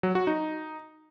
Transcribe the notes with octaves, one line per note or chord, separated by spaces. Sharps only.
F#3
F#4
D#4